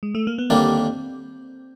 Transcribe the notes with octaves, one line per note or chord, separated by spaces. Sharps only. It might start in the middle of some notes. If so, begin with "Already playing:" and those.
G#3
A3
A#3
B3
D#2 D3 G3 A#3 C4 D4